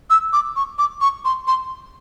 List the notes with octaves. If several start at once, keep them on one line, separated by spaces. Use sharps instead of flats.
E6
D6
C#6
D6
C#6
C6
C6